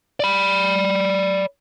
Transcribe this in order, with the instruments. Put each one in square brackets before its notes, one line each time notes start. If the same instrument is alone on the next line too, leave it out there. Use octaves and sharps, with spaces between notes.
[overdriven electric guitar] D5 B5